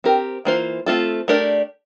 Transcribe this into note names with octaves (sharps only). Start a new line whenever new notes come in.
C4 G4 A#4
E3 A#3 F4 C5
A3 C4 F4 A4
A3 D4 G4 A#4 D5